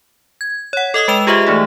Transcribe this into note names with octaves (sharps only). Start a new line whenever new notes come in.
G#6
C#5 F#5
A4 D#5 D6 D#6
G#3 B4 G5 E7 F7
F4 G4 G#4 C5 D#5 E5
E3 A3 D#4 G#4